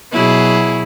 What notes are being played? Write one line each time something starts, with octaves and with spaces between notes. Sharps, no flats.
B2 F#3 E4 G#4